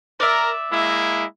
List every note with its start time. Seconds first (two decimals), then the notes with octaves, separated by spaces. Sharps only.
0.20 A#4 D5 E5
0.71 G#3 A#3 E4